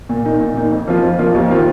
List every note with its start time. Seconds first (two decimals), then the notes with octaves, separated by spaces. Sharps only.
0.09 A#2
0.25 A#3 D#4
0.41 A#2
0.57 A#3 D#4
0.71 F2
0.88 F3 A#3 F4
1.03 F2
1.19 F3 A#3 F4
1.35 D#2
1.50 D#3 C4 F4